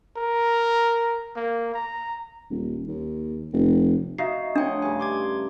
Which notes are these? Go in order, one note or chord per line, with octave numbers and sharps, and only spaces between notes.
A#4
A#3
A#5
D#1
D#2
F1
D#4 F#4 E5 F5 C7
F3 A3 D4 C#5 F#5 G5 D#6
G2 C#3 G#5
C6 D6 G#6